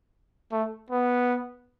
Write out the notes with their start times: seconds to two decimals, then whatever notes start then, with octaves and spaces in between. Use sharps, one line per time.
0.52 A3
0.90 B3